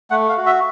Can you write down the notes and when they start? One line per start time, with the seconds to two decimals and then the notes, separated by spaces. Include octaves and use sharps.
0.11 A3 F#5
0.29 F5
0.37 F#4
0.46 E5